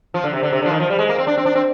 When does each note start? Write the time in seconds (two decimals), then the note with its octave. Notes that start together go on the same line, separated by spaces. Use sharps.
0.14 F3
0.24 D3
0.33 C3
0.43 D3
0.53 C3
0.62 D3
0.66 F3
0.71 D#3
0.80 F3
0.90 G3
0.99 G#3
1.09 A#3
1.18 C4
1.27 D4
1.37 C4
1.46 D4
1.55 C4